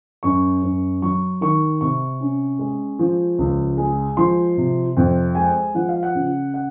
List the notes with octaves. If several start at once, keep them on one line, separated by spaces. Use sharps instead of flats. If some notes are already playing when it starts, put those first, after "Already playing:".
F#2 C#6
F#2
F#3 C#6
D#3 C#6
C3 C#6
C#4
G#3
F3
C#2
G#3
F3 C6
C3
F2
G#3 G#5
F3 F#5
F5
F#5
C#3
F#5